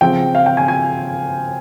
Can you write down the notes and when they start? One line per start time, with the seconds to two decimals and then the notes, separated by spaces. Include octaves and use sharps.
0.01 C#3 F3 C4 G5
0.35 F5
0.46 G5
0.57 G#5
0.68 G#5